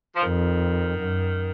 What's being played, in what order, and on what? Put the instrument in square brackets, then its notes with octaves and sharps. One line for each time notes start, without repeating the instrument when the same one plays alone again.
[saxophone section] F3
[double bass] F2 [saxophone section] D#3
[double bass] F#2